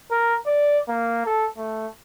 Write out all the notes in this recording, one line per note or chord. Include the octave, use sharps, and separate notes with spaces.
A#4
D5
A#3
A4
A3